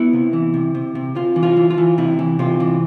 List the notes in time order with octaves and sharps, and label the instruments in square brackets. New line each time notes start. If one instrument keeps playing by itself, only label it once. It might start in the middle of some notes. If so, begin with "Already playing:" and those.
Already playing: [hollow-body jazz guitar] B3 E4
C3
E3
C3
C3
C3
C3 F4
E3
F4
E3
F4
E3
C3 E4
E3
C3 F4
E3